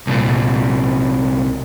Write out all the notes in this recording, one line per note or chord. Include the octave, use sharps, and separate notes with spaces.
C2 A#2